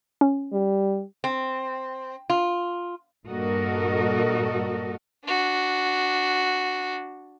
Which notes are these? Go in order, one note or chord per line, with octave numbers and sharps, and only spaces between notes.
C#4
G3
C4
F4
G2 A#2 F#4 A4 A#4 D#5
D4 F#4